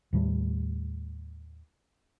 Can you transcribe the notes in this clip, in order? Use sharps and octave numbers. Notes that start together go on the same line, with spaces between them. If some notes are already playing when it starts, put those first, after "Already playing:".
D#2 A2 G3 A3